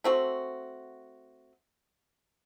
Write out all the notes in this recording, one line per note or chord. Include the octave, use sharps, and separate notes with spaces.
A3 C4 F#4